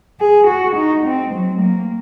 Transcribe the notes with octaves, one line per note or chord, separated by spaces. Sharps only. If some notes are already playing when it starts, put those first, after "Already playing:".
G#4
F#4
D#4
C4
F#3
A#3